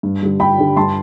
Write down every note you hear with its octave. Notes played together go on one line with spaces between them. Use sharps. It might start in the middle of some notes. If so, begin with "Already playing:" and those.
G2
D3 G3
G2 G5 B5
D3 G3
G2 A5 C6